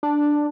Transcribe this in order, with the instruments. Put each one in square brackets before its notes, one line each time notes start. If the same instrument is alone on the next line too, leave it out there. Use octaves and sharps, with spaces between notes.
[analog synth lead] D4